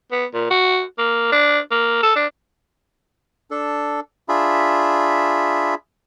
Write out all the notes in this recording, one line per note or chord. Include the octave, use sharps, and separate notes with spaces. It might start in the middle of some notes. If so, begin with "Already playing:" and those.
B3
A#2
F#4
A#3
D4
A#3
A4
D4
D4 A4
D4 F4 G#4 E5 B5